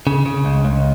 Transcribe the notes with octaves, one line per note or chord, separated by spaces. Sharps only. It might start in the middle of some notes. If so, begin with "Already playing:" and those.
C#3
C#3
C#2
C#2